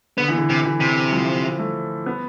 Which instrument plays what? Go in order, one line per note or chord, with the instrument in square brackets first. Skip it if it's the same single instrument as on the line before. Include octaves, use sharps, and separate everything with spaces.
[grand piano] D3 [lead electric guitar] B3
[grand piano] E3
D3
[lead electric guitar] C3
[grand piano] E3
[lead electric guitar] C3
[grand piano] F3
A3
B3